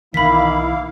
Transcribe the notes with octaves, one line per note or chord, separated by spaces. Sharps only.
B1 D#3 E3 A#3 E4 F5 B5 B6